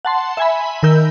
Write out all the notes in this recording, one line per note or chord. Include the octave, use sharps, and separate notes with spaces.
F#5 A5 C6
E5 G#5 B5
D#3 A#4 E6 G6